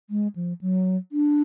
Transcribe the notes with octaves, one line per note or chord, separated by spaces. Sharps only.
G#3
F3
F#3
D4